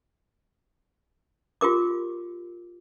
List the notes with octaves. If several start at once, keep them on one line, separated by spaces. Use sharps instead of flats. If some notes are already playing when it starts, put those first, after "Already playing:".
F4 G4 A#4 D6